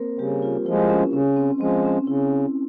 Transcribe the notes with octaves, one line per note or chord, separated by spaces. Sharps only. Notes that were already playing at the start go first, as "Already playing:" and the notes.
Already playing: A#3 C4 A#4 C5
C#3 G3 G4
F4
F3 G#3 E4
C#4
C#3 C#4
C4
F3 G#3 C4
C#4
C#3 E4